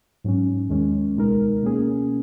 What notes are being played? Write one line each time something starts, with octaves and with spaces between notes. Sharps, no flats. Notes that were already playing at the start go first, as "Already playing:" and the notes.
G#2 F#3 C#4
D#2 D#3 G#3 C#4
C#2 B2 G#3 D#4 A#4
B2 A#3 C#4 G#4